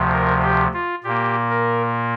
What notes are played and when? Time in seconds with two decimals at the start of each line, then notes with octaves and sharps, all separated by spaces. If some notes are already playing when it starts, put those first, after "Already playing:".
Already playing: D2 C3 F3
0.12 A#4
0.43 G4
0.74 F4
1.04 A#2 A#3 G4
1.50 A#4